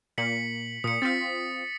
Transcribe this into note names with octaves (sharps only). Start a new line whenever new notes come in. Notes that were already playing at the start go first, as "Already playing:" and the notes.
A#2 A#3 B6 C#7 F#7
A#2 D#6 C#7
C4 F4 A6 B6